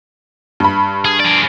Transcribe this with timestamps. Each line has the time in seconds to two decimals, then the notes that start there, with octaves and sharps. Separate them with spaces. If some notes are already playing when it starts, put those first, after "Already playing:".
0.60 G2 B5
1.05 G#4
1.20 G#4 D5